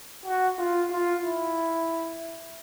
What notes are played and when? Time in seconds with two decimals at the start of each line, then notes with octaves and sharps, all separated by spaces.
0.26 F#4
0.58 F4
0.91 F4
1.23 E4